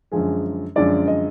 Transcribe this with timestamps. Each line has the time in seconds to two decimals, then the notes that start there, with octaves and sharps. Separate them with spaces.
0.12 F#2 D3 F3 G#3 G#4
0.76 F#2 D3 F3 G#3 D5
1.08 D#5